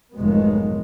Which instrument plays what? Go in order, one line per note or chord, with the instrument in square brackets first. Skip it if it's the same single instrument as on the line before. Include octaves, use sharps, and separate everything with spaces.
[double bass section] F1 G#2 D#3 F#3 G#3 B3